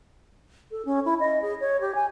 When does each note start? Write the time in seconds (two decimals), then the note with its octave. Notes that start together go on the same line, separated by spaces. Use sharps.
0.71 A4
0.85 C#4
1.05 E4
1.20 D#5
1.42 G#4
1.61 C#5
1.81 G4
1.95 G#5